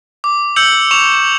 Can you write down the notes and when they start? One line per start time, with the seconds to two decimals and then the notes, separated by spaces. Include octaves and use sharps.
0.24 D6
0.56 E6 G6 C#7 F#7
0.91 C#6 E7 F7